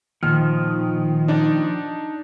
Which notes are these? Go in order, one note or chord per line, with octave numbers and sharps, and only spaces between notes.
A#2 D#3 F3 F6
D4 D#4 D5